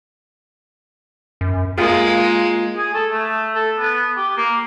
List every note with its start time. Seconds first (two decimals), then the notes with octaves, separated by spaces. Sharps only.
1.41 F#2
1.78 G#3 A#3 F4 G#4
2.76 G#4
2.94 A4
3.12 A3
3.55 A4
3.79 B3
4.17 G4
4.37 A#3